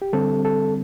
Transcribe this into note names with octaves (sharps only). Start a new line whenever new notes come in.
G4
D3 G3 C4 A4
A4